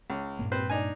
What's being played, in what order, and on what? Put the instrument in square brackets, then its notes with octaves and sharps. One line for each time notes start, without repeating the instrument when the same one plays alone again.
[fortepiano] C#2
[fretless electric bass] G2 A#2 A#3
[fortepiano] C4 B4 C5
D4 D#4 G#5